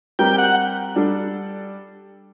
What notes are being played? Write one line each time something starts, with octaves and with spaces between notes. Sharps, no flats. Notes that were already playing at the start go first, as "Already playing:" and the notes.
G3 C4 G4 A#4 G5
F#5
G3 D4 A4